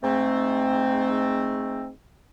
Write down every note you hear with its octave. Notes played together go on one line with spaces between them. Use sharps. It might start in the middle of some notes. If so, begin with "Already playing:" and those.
G#2 A3 C4